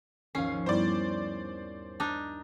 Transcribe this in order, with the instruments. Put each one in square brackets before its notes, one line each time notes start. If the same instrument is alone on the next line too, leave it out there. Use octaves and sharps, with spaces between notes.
[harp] G#1 D#2 F3 [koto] C#4 [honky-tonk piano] F5 C7
[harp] G2 [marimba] G3 B3 E4 [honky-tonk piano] C5 D5
[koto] D4 D#4